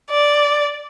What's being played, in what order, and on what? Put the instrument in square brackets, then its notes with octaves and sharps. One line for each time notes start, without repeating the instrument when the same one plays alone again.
[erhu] D5